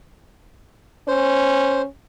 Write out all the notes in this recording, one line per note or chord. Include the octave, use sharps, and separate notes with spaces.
C#4 C5